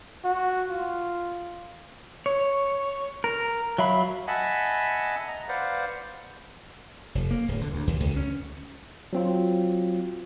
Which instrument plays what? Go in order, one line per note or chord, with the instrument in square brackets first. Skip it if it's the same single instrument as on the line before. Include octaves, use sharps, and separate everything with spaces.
[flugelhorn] F#4
F4
[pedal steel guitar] C#5
A#4
F#3 E5 F5 B5
[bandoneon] D#5 E5 F#5 G#5 A5 B5
D#5 A#5
B4 C5 D5 F5 F#5
[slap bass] F1
A#3
D1
D3
D2
D#2
C#2
C#4
[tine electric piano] F#3 C4 F4